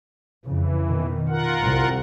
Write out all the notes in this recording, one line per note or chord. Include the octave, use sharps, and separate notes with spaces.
F2 C#3 E3
B2 D#3
F4 A#4 F#5
C2 C4